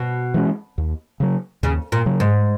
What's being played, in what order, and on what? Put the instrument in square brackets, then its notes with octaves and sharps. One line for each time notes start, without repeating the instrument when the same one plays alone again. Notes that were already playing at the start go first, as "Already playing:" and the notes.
Already playing: [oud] B2
[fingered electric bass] E3 G#3 C#4
D#2
C#3 F#3
[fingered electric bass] D#2 [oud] C#3
[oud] A#2
[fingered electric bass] C#3 F#3
[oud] G#2